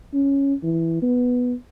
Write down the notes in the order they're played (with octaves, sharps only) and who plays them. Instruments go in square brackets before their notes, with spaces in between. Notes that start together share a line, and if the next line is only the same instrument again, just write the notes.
[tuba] C#4
E3
B3